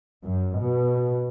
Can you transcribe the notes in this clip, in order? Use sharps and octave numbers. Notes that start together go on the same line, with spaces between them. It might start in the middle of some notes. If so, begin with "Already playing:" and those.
F#2
B2